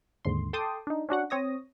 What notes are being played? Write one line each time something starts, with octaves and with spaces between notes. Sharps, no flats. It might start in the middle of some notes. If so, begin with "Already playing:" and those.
D#2 G#2 D3 C6
A4 G5 A5 C6 D6 D#6
D4 D#4
C#4 D4 F#4 F#5
C4 C#5 D#6 A#6